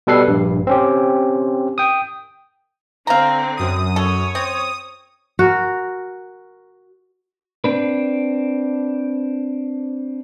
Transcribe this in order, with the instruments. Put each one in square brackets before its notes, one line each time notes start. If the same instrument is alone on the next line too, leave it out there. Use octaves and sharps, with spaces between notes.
[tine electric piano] B2 G3 A4 B4 C7
A#1 G2
C4 C#4 G4
G5 D#6
[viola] D3 C4 [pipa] F5 A#5
[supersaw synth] F#2 D#6
[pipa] A4 [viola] C#5
[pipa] C4 [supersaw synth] D#6
[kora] F#4 A#4
[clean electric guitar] C4 D4 B4